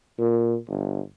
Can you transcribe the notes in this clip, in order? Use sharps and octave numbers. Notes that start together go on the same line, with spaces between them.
A#2
G1